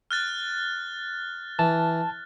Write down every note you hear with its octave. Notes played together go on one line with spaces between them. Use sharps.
F6 F#6 A6
E3 A5